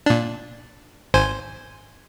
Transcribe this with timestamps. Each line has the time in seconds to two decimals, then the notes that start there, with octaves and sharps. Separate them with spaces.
0.06 A#2 D4
1.14 G#1 C5 G#5